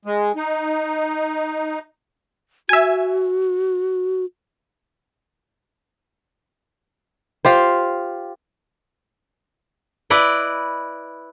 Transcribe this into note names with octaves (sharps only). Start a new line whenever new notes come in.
G#3
D#4
F#4 E5 G#5
F4 G4 C5
E4 B4 D5 D#5